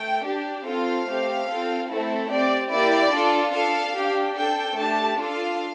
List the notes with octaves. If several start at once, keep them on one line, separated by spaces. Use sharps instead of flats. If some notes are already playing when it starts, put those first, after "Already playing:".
Already playing: A3 G5
D4 G4
C4 F4 A4 F5
A3 C4 G4
C4 F4 A4
A3 C4 E4 A4
C4 G4 D5
A#3 E4 G4 D5
D4 F4 A4
D4 A4 F5
D4 G4
D4 A4 G5
A3 D4 G4 A5
D4 F4 A4 F5